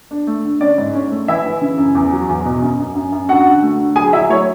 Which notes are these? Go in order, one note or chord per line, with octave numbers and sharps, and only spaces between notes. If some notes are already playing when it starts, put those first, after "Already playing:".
D4
A3
D3
C#4 D5
G#2
C#4
A3
E3 E4 E5
E3
C#3
F#2
E2
F#3
E2
B2
F#2
F#2
F#2
F#2
D3 F#4 F#5
D3
A3
D3
F#3 G#4 G#5
F#3 E4 E5
A3 C#5